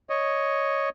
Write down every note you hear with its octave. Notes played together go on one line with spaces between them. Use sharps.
C#5 D#5